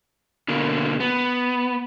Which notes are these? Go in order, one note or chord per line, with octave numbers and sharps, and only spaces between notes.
B2 D3 A#3
B3